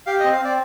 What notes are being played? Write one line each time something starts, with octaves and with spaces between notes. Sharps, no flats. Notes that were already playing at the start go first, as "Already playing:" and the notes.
G4 F5
D#5
C4
F5
C4 D5